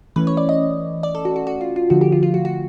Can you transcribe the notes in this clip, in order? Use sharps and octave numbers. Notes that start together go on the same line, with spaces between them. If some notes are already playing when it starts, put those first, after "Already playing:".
E3 A3 C#4 B4
C#5
D5
D#5
D5
A4
F#4
F#4
F#4
F4
F4
D3 F3 A3 F#4
G4
F4
F4
F#4
F#4